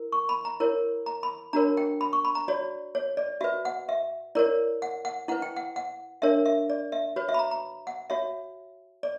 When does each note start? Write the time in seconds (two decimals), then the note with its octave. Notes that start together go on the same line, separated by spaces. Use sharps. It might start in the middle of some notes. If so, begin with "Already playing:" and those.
Already playing: E4 A#4
0.12 C#6
0.29 B5
0.45 A#5
0.60 E4 A#4 C#5
1.06 A#5
1.23 B5
1.53 D4 F#4 A#4 C#5 A#5
1.77 G5
2.01 B5
2.13 C#6
2.25 B5
2.35 A#5
2.48 F#4 C#5 D5
2.95 C#5
3.17 D5
3.41 F#4 B4 E5
3.65 F#5
3.89 E5
4.35 E4 A#4 C#5 D5
4.82 F#5
5.05 F#5
5.28 E4 B4 F#5
5.42 G5
5.56 F#5
5.76 F#5
6.22 D4 A#4 C#5 E5
6.46 E5
6.70 D5
6.92 E5
7.16 F#4 B4 C#5
7.29 E5
7.34 B5
7.39 A#5
7.51 A#5
7.87 F#5
8.10 F#4 C#5 E5
9.03 D5